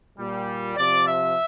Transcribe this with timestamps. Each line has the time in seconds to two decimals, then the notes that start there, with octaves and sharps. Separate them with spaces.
0.17 A#2 G3
0.76 C3 F3 D5
1.06 E5